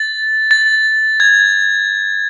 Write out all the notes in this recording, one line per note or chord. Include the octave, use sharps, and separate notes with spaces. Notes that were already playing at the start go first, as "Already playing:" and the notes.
Already playing: A6
A6
G#6